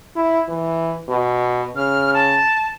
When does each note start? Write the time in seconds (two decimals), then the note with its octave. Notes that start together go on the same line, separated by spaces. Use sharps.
0.16 E4
0.49 E3
1.08 B2
1.76 C#3 F6
2.14 A5